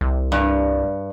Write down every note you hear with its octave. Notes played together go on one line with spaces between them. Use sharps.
C2
G2